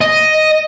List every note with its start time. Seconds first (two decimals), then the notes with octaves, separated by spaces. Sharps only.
0.01 D#5